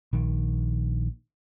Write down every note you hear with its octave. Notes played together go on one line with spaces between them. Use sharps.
A#1 D#3